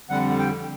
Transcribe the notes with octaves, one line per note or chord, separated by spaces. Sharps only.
F2 D3 G3 F#5
G5